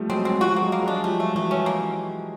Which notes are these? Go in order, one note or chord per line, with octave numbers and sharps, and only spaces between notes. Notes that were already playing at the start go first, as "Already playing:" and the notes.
Already playing: F3 G3 A3
F#3 G#3 C4
C4
F3 G3 F#4
A#3
F#3 G#3
A#3
F#3 G#3 D4
F3 G3 A3
A3
E3 F#3 A3
C#4
A#3